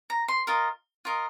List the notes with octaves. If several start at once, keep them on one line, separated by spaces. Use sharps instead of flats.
A#5
C6
F4 A#4 D#5
F4 A#4 D#5